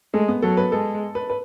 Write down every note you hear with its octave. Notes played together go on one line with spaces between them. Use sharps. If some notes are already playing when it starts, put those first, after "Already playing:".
G#3 A3
B3
F#3 A4
B4
G#3 A4
B4
B4